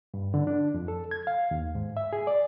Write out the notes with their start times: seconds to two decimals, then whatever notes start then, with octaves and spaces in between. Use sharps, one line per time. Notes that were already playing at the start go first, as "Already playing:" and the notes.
0.14 G2
0.34 D3
0.47 D4
0.74 F2
0.88 A4
1.11 G#6
1.27 F5
1.51 D#2
1.75 G#2
1.97 E5
2.13 G#4
2.27 D5